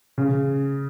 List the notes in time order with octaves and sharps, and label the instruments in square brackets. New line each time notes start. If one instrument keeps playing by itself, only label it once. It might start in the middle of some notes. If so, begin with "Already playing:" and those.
[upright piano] C#3